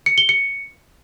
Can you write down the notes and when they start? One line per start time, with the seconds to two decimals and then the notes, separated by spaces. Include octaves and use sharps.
0.06 C#7
0.18 G7
0.29 C#7